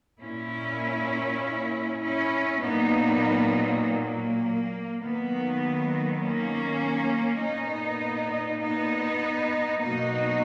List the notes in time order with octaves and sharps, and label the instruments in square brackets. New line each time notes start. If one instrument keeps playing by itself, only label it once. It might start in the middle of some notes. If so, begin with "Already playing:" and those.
[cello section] A#2 A#3 C#4 E4
C#4 E4
A#2 F#3 A#3 B3 D#4
A#3
D#3 F#3 A#3 B3
A#3 C#4
A#2 A#3 B3 D#4
B3 D#4
B2 F#3 A#3 D#4 F#4